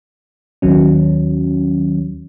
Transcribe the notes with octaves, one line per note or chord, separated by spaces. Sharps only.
D#2 D#3 F#3 C#4